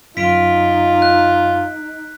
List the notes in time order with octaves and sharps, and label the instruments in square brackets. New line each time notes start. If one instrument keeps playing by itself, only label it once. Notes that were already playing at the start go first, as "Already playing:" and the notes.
[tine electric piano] G1 F#2 [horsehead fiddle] D#4 [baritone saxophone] F4 [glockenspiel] B6 D7
[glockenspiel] F#6